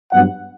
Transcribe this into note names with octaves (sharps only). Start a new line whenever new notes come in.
G2 F#3 B3 F#5